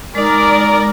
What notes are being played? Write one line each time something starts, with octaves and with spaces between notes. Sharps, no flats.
G#3 D#4 A#4 D5